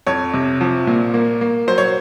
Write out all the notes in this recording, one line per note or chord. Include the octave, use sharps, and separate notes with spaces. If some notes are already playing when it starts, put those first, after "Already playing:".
F2 C#5
C3
F3
A#2
A#3
A#3
F#3 C5
C#5